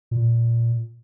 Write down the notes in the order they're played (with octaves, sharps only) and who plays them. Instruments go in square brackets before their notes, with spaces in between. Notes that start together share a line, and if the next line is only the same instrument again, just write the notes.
[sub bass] A#2